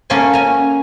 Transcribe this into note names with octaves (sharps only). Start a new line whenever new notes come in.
A#3 C#4 A4 F5 F#5 G#5
C#4 G#5 A#5